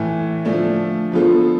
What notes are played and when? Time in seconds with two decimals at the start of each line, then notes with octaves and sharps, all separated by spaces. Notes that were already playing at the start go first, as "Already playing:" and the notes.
Already playing: A2 E3 A3
0.45 D3 F3 A3 D4
1.12 D3 F3 B3 F4 A4